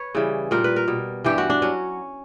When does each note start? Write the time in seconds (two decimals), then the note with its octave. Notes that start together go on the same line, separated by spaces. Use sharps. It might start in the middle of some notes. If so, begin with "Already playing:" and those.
Already playing: B4 C#5
0.15 C#3 E3 G3
0.51 A#2 G3 A#4
0.64 B4
0.76 A#4
0.88 B2 G3
1.24 G2 E3 G3 G4
1.38 F#4
1.50 D4
1.62 F#3 C#4